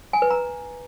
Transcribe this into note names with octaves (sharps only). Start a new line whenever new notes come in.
G#5
B4
A#5